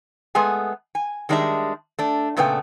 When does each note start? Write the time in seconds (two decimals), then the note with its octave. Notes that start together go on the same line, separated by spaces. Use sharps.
0.35 G#3 A3 B3 G#4 G#5
0.95 G#5
1.29 D#3 G3 G#3 D4 E4 E5
1.99 A3 D4
2.37 A#2 C#3 A3 B3 C5 G5